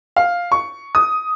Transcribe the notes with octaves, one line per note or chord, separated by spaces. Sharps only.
F5
C#6
D#6